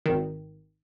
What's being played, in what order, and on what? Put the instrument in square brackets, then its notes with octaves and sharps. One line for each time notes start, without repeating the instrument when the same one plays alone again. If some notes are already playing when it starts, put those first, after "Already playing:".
[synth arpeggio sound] G#1 D#3